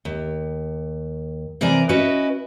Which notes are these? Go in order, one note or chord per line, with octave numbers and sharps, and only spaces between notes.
D#2
C3 E3 A#4 D5 G#5
C#4 E4 F#4 B4 D#5